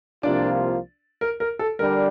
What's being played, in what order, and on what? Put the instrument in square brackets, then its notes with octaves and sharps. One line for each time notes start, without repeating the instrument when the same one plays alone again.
[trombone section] C2 C3 F3 A#3 F4 [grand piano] D4 D5
[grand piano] A#4
A#4
A4
[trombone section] D3 G3 D4 [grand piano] A#4